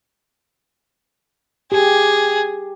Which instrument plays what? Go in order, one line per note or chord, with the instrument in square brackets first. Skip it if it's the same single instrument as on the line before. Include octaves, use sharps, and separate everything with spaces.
[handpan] G4 [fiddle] G#4